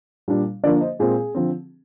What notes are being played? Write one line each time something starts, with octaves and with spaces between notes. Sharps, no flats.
A#2 G3 D4
D3 F3 A#3 D4 A#4 D5
C5 D#5
A#2 G#3 C4 G#4
D3 F3 C4